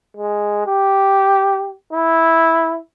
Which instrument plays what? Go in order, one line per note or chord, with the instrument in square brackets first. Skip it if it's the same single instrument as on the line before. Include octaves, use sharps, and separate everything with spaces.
[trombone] G#3
G4
E4